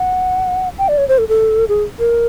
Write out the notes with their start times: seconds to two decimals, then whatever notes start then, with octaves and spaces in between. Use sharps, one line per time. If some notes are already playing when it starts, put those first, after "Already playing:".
Already playing: F#5
0.78 G5
0.88 D5
0.98 C#5
1.09 C5
1.18 A4
1.29 A4
1.69 G#4
1.99 A#4